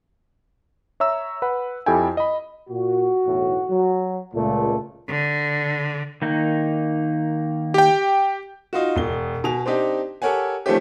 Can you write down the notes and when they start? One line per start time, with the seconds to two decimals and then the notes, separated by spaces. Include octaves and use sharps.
1.00 C#5 E5 A#5 E6
1.42 B4 F#5 B5
1.86 F2 E4 G4 A4 G5 G#5
2.17 D#5 B5
2.70 A#2 F#4
3.26 B1 E2 A2
3.71 F#3
4.34 C#2 A#2 A3
5.08 D3
6.22 D#3 A#3 D#4
7.74 G4 G5
8.73 D#4 F4 F#4
8.96 E1 G7
9.44 B2 G#5 F7
9.66 C4 D4 D#4 G4
10.22 G4 A4 A#4 C#5 F#5 G#5
10.66 D#3 F3 A3 C4 C#4 G4